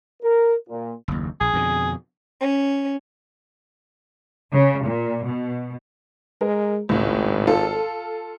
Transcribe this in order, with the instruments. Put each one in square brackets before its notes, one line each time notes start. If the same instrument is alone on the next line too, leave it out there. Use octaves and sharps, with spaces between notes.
[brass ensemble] A#4
A#2
[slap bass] F#1 D#2
[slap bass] A#1 [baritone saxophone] G#4
[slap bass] F2 B2 D3
[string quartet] C#4
[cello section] C#3
A#2
B2
[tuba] G#3 [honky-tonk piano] A#4
[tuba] G#1 [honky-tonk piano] C#2 A2
[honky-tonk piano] F4 A4